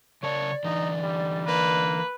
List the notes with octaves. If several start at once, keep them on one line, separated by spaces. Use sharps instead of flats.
C#3 A#4 C#5 D5 A5
D3 E3 D#4
G3
A#3 B4